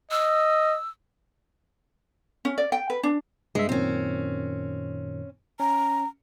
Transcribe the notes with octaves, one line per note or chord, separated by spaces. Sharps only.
D#5 E6
C#4
D5
G5
B4
D4
G2 G#3 E5
F#2 A#2 D#3 C4 C#4
C#4 A#5